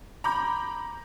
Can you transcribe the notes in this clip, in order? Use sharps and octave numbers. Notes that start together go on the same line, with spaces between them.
A#5 B5 D6 G6